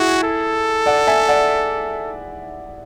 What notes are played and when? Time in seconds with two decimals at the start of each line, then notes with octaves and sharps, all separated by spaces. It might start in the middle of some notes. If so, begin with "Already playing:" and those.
Already playing: E4 F#4 G#4
0.23 A4
0.86 D5 F#5
1.07 E5 G#5
1.29 D5 F#5